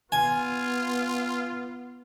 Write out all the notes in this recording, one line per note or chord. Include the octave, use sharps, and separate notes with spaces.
B3 F4 G#5